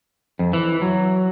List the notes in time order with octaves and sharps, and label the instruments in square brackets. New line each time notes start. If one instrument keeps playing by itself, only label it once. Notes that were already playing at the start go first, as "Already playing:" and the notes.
[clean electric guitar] F2
E3
F#3